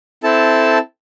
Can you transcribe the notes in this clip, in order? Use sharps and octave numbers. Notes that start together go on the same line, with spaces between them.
C4 E4 A4 A5